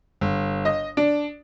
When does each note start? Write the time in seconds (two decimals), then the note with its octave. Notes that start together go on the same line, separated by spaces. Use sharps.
0.21 G1
0.65 D#5
0.97 D4